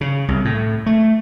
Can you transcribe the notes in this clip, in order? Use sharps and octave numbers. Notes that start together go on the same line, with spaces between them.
C#3
C2
A2
A3